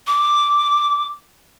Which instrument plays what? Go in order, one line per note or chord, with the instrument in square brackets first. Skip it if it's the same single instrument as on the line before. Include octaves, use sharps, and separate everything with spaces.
[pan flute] D6